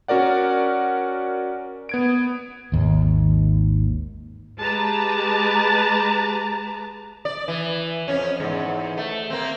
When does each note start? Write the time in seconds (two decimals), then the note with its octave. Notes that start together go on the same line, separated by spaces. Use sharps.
0.08 C#4 F#4 A#4 D5 F#5
1.89 B3 G#6 D7
2.72 G#1 D#2
4.58 G#3 G4 B4 A5 A#5
7.25 D5
7.48 E3
8.08 F2 C#4
8.40 E2 G#2
8.97 A3
9.30 A#3 C4